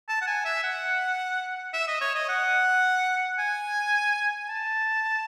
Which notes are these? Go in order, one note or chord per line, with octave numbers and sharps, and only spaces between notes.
A5
F#5
G#5
E5
F#5
E5
D#5
C#5
D#5
F#5
G#5
A5